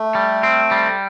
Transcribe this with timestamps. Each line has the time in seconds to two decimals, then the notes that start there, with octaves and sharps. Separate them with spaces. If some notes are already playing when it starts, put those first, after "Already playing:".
Already playing: A3
0.15 G3
0.43 C4
0.71 G3